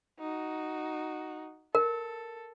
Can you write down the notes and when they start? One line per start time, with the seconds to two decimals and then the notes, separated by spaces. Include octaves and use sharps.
0.20 D#4 F#4
1.75 A4 A#4